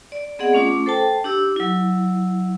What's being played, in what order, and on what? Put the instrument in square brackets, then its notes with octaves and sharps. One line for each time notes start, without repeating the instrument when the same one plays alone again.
[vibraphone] D5
B3 C4 G#4 D5 D#5 F#5
A3 C#4 F4 D6
A4 C5 G5 A5
D4 G4 E6
F#3 E4